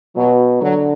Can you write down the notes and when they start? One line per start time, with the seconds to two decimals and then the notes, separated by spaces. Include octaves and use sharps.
0.16 B2 F#3
0.61 D3 F#3